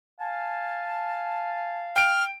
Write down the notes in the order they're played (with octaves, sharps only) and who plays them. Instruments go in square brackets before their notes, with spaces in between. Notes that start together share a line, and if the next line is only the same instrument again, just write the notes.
[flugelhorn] F5 [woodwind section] G#5 A5
[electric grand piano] G5 D7 [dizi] F6